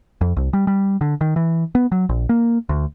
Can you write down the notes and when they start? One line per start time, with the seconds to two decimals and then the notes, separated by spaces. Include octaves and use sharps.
0.21 F2
0.37 C2
0.53 G3
0.67 G3
1.01 D3
1.21 D#3
1.36 E3
1.75 B3
1.92 F#3
2.09 A#1
2.29 A#3
2.69 D2